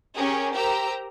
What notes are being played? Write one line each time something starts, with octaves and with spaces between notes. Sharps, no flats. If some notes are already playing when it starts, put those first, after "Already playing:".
C#4 G4 G#4 A#4
G4 A#4 C5 G5 A#5 E6